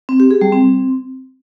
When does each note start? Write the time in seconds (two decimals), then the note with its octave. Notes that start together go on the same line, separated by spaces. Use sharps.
0.09 C4
0.20 G4
0.31 G#4
0.41 G3
0.52 C4